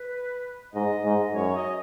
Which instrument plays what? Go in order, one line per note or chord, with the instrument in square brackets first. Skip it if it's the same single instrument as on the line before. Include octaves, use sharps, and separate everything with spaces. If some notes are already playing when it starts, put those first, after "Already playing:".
Already playing: [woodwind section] B4
[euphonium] G#2 [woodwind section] D#5
[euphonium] G#2
[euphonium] F#2 [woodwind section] C#5
[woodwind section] D#5